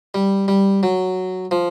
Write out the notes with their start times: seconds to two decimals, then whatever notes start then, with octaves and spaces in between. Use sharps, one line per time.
0.14 G3
0.48 G3
0.83 F#3
1.51 F3